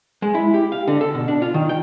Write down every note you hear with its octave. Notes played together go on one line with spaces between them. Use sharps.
G#3
E4
G4
F5
D3
A4
B2
D4
F4
D#3
G5